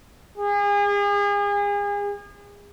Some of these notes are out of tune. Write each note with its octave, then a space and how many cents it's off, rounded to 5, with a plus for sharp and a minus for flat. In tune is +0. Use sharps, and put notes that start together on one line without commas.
G#4 -35